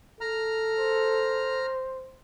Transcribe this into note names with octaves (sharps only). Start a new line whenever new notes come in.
A4 A#5 F6
C5